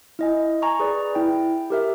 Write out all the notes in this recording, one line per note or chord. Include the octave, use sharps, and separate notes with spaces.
E4 D#5 G#5
G#5 A#5 C#6
G#4 B4 D5
E4 G5
G4 A#4 E5